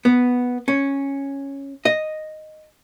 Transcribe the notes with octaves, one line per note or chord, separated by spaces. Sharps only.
B3
C#4
D#5